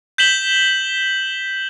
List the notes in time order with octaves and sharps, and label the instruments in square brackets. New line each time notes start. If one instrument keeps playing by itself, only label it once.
[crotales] G6 B6 E7 F#7 G7